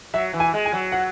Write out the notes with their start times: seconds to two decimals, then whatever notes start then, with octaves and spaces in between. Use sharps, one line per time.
0.14 F#3 E5
0.33 E3
0.40 G#5
0.54 G#3
0.66 G#5
0.73 F#3
0.92 F#5